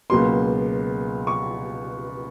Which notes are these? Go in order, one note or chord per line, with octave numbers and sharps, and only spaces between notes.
C#2 B2 F#3 A#3 C6
C#6